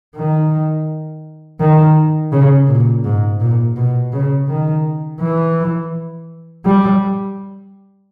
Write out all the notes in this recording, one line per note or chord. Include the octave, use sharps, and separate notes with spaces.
D#3
D#3
C#3
A#2
G#2
A#2
B2
C#3
D#3
E3
G3